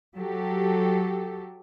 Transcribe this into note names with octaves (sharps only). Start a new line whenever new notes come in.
F#3 G4 A4